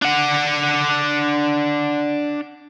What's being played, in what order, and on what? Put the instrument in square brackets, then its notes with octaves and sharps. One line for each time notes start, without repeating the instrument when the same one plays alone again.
[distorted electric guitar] D4 F#5